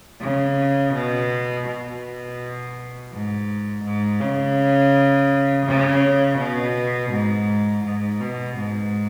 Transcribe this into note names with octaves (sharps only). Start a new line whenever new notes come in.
C#3
B2
B2
G#2
G#2
C#3
C#3
B2
G#2
G#2
B2
G#2